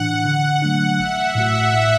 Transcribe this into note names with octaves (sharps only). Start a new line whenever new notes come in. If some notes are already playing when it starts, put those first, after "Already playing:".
Already playing: A2 E3 D4 F#5
D3
F#3 A3 D4
A1 E5
A2 A3 F#4
A2